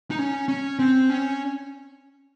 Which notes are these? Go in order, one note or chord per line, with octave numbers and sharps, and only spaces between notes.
D#4
C#4
C#4
C4
C#4